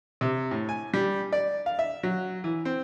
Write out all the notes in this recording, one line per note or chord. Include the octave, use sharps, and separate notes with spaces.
C3
A2
G#5
G3
D5
F5
E5
F#3
E3
C4